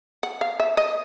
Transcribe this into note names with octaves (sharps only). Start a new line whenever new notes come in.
F#5
F5
E5
D#5